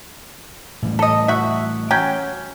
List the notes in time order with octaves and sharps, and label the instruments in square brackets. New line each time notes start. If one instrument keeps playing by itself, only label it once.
[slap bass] A2 E3 G3
[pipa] A4 D#5
F#4 E5
F#3 C#4 G5